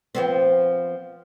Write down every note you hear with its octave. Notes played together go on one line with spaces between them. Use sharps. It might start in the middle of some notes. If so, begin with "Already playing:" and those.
F3 B3 C4